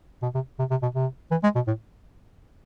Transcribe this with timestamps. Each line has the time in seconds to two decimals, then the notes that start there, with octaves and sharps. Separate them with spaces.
0.22 B2
0.34 C3
0.59 C3
0.70 C3
0.82 B2
0.95 C3
1.31 E3
1.43 G#3
1.55 B2
1.67 A2